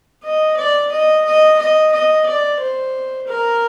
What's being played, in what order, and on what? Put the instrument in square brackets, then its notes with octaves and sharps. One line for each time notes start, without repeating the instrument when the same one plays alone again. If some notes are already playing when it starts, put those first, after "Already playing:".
[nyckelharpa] D#5
D5
D#5
D#5
D#5
D#5
D5
C5
A#4